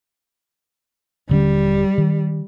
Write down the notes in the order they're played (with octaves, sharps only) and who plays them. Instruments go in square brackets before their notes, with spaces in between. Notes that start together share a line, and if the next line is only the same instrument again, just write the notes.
[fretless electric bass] D#1 D3 C#4 [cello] G3
[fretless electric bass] D#3